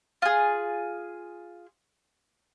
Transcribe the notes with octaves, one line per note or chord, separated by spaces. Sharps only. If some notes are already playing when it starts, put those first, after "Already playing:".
F4 G#4